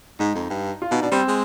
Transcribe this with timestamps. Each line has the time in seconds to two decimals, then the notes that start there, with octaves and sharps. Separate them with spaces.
0.19 G#2 D#4
0.35 F2
0.50 G2
0.82 F4
0.91 B2 D#4
1.02 B2 D4
1.12 G3 C4
1.28 G#3